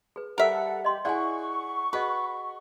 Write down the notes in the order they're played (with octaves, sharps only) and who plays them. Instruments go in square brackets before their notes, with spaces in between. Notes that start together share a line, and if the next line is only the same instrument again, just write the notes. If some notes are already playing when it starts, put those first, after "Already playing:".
[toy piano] G#4 B4
[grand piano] G3 [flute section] A4 F#5 [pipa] A#4 E5
[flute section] G4 [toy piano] D#5 C6
[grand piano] E4 G#4 F#5 [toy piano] D5 G#5 [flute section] C#6
[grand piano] F#4 [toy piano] G#4 D#5 [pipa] B4